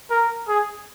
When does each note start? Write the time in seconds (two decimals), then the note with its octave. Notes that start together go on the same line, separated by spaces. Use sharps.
0.10 A#4
0.48 G#4